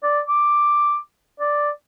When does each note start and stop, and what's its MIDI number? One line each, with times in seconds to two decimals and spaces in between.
0.03 0.20 74
0.29 0.97 86
1.40 1.70 74